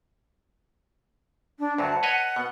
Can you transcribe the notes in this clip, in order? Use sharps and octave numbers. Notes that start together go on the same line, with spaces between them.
D4
D2 G2 F#3 F#5 A5
B4 C#5 D#5 F#5
B2 B3